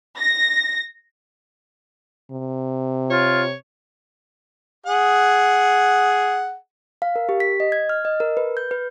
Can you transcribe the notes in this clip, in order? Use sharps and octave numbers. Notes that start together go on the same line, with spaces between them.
A#6
C3
F4 C#5
G#4 F#5
F5
A#4
G4
B6
D#5
G#6
F6
D#5
A#4
B4
G6
B4